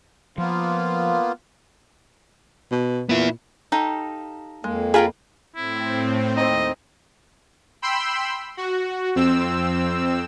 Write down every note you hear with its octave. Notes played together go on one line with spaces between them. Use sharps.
F3 A#3 B3 F4
B2
A#2 B3 E4
D#4 G4 A4 F5
F2 G#3 A#3
F4 G#4 G5 A#5 B5
A2 C4 E4
D#2 C4 D#4 D#5
G5 B5 C6 E6
F#4
F2 C4 E6